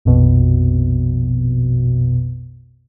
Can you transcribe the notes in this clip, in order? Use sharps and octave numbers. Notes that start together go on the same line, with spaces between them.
A#1 F2 B2